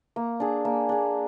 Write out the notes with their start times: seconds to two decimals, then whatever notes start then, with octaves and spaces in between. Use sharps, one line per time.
0.16 A#3
0.40 D4 G#4
0.65 A#3
0.89 D4 G#4